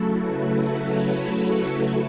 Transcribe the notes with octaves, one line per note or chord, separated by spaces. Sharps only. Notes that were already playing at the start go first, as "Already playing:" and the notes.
Already playing: C#3 F#3 A3 E4 F#4 A4
B4
C#5